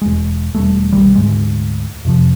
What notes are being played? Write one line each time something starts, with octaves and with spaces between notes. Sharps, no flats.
E1 G#3
E1 F2 G3 A3
B1 B2 D#3 G3
D2 G#2 G#3
F2 C3 F3